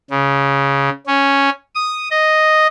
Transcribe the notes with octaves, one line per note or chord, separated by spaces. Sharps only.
C#3
C#4
D#6
D#5